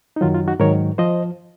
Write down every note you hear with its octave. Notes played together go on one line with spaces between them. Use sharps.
D#4
F#2 D#3 F#3 F4
F4
D#4 F#4
G#2 D#3 F#3 A#4 C#5
F3 C5 D#5